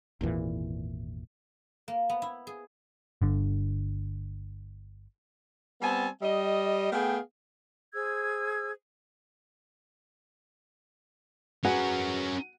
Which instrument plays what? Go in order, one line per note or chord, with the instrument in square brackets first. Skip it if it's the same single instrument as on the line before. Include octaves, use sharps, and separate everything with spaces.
[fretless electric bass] G#1 E2 A#2 E3
[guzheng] A#3
B3
E4
G#4
[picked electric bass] G1 D3
[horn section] G3 B3 C4 G#5 A5
G3 D#5
A3 B3 G#4 F5 G5
[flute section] G#4 C5 E6 G#6
[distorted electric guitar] C#4 A#4 [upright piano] F#4 [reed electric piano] G#4 B4 G#5 [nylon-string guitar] F#5